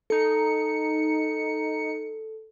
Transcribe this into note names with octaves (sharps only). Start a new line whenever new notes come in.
D#4 A4 C#7